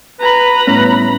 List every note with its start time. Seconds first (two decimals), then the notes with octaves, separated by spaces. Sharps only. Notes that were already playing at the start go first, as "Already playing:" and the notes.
0.20 B4 A#5 B5
0.67 A2 G3 A3 B3 C#4